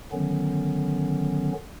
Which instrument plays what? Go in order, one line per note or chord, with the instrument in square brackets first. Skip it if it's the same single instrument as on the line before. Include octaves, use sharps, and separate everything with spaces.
[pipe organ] D3 D#3 F#3 B3 C#4